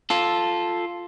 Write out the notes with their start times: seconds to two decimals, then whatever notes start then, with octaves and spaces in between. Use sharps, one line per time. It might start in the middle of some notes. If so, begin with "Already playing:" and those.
0.10 F4 A4